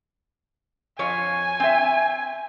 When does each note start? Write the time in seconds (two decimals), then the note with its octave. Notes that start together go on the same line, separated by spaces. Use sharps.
0.99 F2 F4 C#5 G#5
1.60 C4 E5